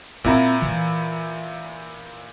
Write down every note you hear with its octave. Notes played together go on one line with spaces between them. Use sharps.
A#2 C4 E4 A#5
E3